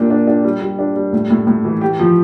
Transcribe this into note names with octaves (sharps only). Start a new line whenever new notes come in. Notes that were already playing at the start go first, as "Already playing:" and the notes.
Already playing: A#2 D4 G4
D4
D4
G3
G3
D4
G3
A2
A2
A2
E3
G4
F3